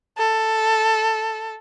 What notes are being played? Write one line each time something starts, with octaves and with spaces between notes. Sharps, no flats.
A4